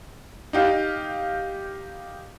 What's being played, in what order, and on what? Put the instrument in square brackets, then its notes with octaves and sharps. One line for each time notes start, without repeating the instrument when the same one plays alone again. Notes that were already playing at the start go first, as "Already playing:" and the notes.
[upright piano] D#4 G4 F5